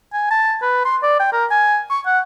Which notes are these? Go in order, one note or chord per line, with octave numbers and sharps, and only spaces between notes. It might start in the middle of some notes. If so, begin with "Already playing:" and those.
G#5
A5
B4
C6
D5
G5
A#4
G#5
C#6
F#5